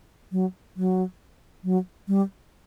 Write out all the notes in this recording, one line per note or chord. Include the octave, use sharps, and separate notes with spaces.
F#3
F#3
F#3
G3